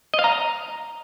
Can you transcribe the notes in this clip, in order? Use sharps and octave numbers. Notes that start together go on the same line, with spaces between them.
D#5
F5
A#5